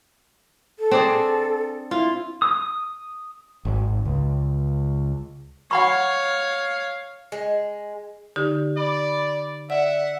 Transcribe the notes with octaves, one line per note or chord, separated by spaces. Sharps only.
A4
C4 D4 G#4
E4 F4
D#6
G#1
C#2
C#5 F5 F#5 B5 C#6
G#3
D3 D#4 G4
D5 B5
D5 E5 F#5